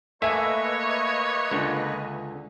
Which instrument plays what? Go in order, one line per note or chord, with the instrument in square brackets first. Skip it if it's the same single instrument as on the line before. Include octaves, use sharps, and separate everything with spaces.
[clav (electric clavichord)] A3 G#5 [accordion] A#3 B4 D#5 [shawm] C#5 [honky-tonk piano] E5
[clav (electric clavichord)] C#2 D3